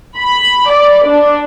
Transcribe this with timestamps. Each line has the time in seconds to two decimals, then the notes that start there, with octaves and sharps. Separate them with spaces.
0.17 B5
0.70 D5
1.08 D4